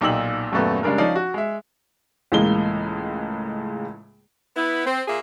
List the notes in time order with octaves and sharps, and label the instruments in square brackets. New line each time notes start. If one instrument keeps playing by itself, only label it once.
[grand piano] B1 A#2 D#4 G5 E6 F#7
D#1 F#2 A#2 A3 B3
C#3 G3 G#3 D4 A#4
F3 C#4 D#4 D5 F5
F#4
G#3 E5
[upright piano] C#2 A2 E3 G#3 A#3 G7
[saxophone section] B3 E4
C4
A#2 A#3 G#4 E5